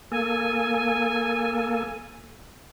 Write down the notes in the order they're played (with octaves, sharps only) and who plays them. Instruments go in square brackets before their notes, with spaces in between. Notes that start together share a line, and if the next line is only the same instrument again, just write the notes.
[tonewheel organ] A#3 A4 [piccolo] G#5